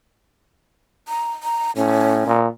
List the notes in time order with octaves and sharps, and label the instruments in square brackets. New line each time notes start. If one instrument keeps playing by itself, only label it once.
[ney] A#5
A#5
[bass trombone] A2 [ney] C#4
[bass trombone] A#2